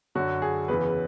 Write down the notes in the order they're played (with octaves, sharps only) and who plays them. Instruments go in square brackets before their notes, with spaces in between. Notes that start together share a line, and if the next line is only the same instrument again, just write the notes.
[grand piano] F#2 D3 F#3 F#4
G#4
E2 C#3 E3 B4